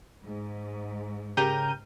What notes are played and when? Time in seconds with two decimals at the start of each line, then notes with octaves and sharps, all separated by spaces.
0.23 G#2
1.37 C#3 G4 A#4 G6 D#7